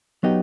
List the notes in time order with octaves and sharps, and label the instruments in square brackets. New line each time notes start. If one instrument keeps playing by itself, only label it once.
[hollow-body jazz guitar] F#3 B3 D#4 G4 D#5